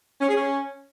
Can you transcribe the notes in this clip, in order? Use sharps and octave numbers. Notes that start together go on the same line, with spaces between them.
C#4
G#4
C#4